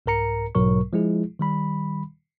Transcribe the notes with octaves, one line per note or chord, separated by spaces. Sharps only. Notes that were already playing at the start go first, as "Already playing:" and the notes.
C2 G#2 A#4 A#5 C#7
B1 G#2 B2 F#3 A#4 C#6
F3 G#3 E4 G#4
D#3 G3 B5